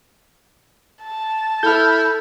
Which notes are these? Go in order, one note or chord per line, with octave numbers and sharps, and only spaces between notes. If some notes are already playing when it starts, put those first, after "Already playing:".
A5
E4 A4 E6 F6 G6